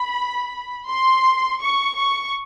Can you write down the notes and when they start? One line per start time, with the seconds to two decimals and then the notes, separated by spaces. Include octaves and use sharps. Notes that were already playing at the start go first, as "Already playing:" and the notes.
Already playing: B5
0.88 C6
1.61 C#6
1.96 C#6